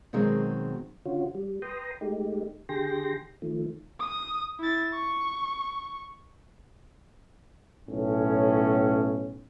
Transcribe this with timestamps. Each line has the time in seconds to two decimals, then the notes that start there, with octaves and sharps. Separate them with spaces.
0.13 B2 D#3 F#3 G#3 C4
1.06 D3 C#4 F4 F#4
1.35 G3
1.62 B4 G5 A#5 C6 D#6
2.01 G#3 A3 D#4 G4
2.69 D3 G4 G#4 G5 C6 A#6
3.42 D#3 F3 A3
4.00 D#6
4.60 E4 A6
4.94 C#6
7.88 B1 A2 C#4